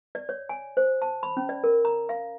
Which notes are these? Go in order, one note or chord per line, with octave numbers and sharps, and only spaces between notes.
D5
C#5
G#5
C5
A5
B5
C#4
D5
A#4
A#5
F5